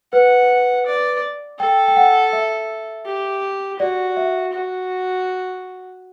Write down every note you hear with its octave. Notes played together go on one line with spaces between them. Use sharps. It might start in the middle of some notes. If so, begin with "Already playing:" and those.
B4 F#5
D5
A4 G5
G5
F#5
E5
G4
F#4 D5
E5
F#4